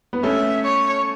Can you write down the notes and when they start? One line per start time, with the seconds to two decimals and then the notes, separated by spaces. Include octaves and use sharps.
0.13 B3
0.23 A3 C#4 E5
0.64 C#5